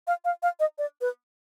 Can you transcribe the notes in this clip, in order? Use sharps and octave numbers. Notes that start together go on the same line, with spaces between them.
F5
F5
F5
D#5
D5
B4